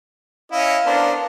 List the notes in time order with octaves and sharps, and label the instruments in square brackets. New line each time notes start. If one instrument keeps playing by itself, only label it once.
[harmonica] C#4 E4 D#5 [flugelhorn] F5
[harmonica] B3 A#4 C5 [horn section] D4